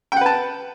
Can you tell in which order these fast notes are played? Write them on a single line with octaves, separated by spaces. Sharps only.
G5 F#5 B4 A5